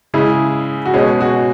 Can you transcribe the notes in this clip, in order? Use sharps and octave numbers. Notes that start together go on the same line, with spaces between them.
C#3 G#3 E4 G#4
F#4
B2 G#3 C#4 G#4
F#4